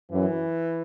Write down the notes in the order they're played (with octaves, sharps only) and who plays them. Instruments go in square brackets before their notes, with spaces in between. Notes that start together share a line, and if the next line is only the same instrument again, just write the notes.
[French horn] F#2 [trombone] E3